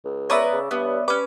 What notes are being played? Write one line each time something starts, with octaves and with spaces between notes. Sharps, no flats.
C#2
B3 A#4 B4 C#5 D5 E5
C#3
G2 B3
G3 C#4 B4 D6